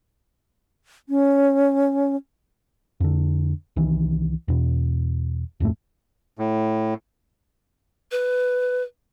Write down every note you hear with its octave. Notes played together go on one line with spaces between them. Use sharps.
C#4
F2 D3
C2 D#3 E3
E2 B2
D1 F2 A2 A3
A2
B4